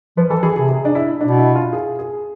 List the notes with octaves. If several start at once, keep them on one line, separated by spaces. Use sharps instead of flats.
F3 B4
E3 A4
E3 G#4
C3 G#4
G#4
D4
E4
B2 D4
E4
F4
G#4
G#4